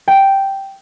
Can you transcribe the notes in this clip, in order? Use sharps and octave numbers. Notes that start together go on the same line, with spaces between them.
G5